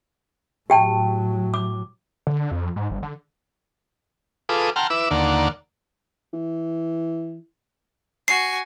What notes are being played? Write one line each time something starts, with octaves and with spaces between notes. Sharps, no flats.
A2 F#3 G4 G5 A5
D6
D3
F2
G#2
G1
D3
F4 G#4 A4 B4 D6 D#6
F#5 G5 A5 A#5 C6 F6
E4 B4 D6 E6
D#2 D3 A#3 D5 F#5
E3
F#4 G#5 C7